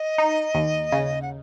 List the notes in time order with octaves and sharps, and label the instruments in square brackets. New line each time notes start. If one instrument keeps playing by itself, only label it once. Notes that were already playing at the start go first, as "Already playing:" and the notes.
Already playing: [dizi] D#5
[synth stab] D#4
D#2
C#3
[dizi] F#5